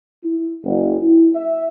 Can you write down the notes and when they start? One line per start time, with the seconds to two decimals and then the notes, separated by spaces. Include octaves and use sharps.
0.23 E4
0.64 F#1
1.01 E4
1.35 E5